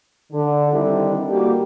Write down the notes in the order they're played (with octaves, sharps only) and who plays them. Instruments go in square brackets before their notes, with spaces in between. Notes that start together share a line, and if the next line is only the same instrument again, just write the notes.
[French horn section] D3
D3 D#3 G3 C4 E4
G3 A#3 F#4 G4